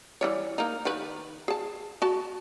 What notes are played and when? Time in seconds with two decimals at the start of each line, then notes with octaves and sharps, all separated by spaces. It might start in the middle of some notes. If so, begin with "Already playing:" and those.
0.21 E3 G3 C#5
0.58 A#3 D#4
0.85 D#3 G4 B4
1.48 G#4 A5
2.02 F#4 A5